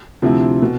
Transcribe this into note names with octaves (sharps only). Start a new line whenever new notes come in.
D2 C3 F3 C4 E4
B2